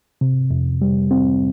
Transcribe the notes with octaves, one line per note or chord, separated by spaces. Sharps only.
C3
F2
G3
C4